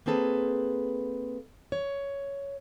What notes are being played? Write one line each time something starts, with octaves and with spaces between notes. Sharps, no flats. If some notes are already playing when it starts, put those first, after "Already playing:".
A#3 C4 G#4 A4 B4
C#5